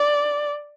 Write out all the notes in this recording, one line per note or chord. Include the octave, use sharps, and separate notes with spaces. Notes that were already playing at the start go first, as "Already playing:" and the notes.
Already playing: D5